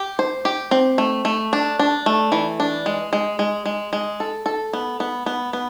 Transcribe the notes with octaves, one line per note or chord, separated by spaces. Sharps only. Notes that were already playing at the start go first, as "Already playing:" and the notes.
Already playing: G4
C5
G4
C4
A3
A3
D4
D4
A3
E3
D4
G#3
G#3
G#3
G#3
G#3
A4
A4
B3
B3
B3
B3